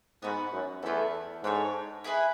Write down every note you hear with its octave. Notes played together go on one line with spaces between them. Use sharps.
G#2 B3 F#4 B4
F#2
E2 A3 E4 A4
G#2 D4 A4 C#5
E4 G#4 B4